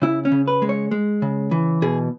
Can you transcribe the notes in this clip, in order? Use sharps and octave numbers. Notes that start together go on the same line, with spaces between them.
C#3 E4
C#4
C#3
B4
G#3
C#5
G#3
C#3
E3
B2 G#4